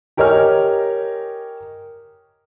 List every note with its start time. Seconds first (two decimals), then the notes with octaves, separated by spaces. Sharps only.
0.17 G4 A#4 C#5 D#5 G#5 F6